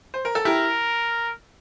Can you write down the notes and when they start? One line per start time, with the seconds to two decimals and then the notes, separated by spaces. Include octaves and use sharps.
0.14 C5
0.25 A#4
0.35 A4
0.45 E4 G4 A#4